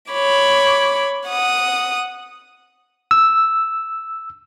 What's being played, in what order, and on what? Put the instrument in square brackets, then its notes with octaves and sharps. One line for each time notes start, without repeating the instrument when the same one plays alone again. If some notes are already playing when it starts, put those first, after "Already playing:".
[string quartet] C#5 B5 D6
F#5 D#6
[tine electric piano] E6